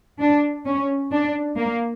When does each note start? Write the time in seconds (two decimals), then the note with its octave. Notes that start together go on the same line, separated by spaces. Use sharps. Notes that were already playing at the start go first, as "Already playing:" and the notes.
0.19 D4
0.65 C#4
1.12 D4
1.57 A#3